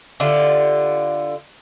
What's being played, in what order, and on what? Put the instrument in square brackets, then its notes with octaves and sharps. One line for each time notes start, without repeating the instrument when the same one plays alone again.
[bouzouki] D3 E4 F4 G4